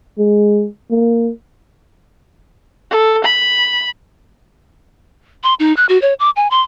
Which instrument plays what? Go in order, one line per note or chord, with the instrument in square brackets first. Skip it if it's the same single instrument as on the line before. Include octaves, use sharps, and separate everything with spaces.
[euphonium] G#3
A#3
[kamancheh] A4
B5
[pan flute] C6
D#4
F#6
F#4
C#5
D6
G#5
C6